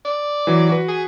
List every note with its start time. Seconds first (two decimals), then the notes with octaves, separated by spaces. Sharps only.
0.05 D5
0.47 E3 F#3
0.69 F#4 B4
0.89 G#4